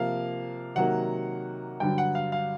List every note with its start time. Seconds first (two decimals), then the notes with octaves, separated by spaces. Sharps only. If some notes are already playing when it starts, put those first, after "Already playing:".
Already playing: C3 F3 A#3 F5
0.75 C3 D#3 F#3 A#3 F#5
1.80 G2 D3 F#3 G5
1.98 F#5
2.15 F5
2.32 F5